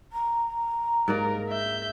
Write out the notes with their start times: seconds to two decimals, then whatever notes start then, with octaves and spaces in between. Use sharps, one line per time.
0.12 A#5
1.08 G#2 A#3 A#4 D5
1.49 E5 G6